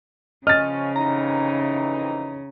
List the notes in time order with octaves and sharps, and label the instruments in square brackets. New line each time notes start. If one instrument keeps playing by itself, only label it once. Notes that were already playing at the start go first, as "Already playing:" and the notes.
[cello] C#3 [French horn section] F3 C#4 [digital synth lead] D#5 [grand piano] F6 A6
[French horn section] F2 E3 D#4 [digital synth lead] A#5